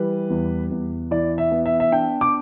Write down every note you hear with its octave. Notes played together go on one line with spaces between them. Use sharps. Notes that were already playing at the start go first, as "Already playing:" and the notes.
Already playing: E3 G3 B4
E2
E2
E3 D5
E5
B3
E5
E5
D4 G5
D6